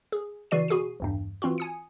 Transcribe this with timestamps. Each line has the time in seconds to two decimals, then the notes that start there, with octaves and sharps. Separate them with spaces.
0.12 G#4
0.51 C#3 E3 F#4 D5 C7 D#7
0.68 B2 F#4 G#4 C7 D#7
1.00 A1 E2 G2
1.42 E3 C4 F4 F#4
1.58 G#5 D#6 C#7